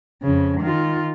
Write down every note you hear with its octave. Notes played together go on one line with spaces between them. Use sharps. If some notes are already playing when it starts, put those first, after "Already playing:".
F2 C#3
D#3 F4